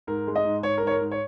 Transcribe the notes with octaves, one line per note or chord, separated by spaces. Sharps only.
G#2 A#4
G#3
D#5
G#2
G#2 C#5
A#4
G#2 C#5
A#4
G#2
C#5